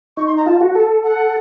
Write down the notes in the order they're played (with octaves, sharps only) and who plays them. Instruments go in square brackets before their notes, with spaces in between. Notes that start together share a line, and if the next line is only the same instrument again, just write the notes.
[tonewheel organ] D#4 [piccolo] C#6
[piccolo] C6
A#5
[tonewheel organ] F4 [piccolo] A5
[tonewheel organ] F#4
[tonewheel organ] A4 [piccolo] A5
[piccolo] F#5